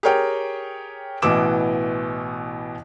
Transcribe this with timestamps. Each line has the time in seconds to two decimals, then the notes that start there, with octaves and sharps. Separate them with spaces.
0.03 G4 G#4 A#4 C#5 G5
1.22 A1 B2 E3 B3 D6 E7